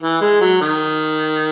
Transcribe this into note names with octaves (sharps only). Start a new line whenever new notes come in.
E3
G#3
F#3
D#3